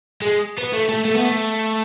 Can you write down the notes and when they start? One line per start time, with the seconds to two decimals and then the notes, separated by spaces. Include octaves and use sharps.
0.22 G#3
0.58 B3
0.73 A3
0.89 A3
1.05 A3
1.14 B3
1.24 A3